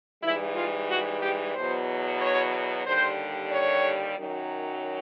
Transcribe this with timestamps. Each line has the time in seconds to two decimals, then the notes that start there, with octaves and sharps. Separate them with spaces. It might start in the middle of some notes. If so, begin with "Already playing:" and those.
0.23 G#2 E3 G3 E4
0.56 F4
0.89 F#4
1.21 G4
1.54 E2 B2 F#3 C5
2.20 C#5
2.86 D#2 D3 G3 C5
3.52 C#5
4.17 F#2 D#3 F#3